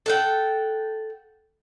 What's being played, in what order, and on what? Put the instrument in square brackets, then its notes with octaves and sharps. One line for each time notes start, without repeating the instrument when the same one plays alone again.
[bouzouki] A4 F#5 G5